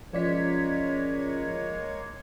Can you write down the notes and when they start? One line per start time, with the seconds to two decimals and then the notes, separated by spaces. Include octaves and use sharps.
0.13 F3 G#3 A#3 C#4 F4 C#5 D5 B6